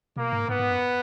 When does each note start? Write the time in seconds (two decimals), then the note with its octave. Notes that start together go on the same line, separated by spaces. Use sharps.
0.16 B2 A#3
0.33 G#2
0.49 G#2 B3
0.59 G#2
0.70 F#2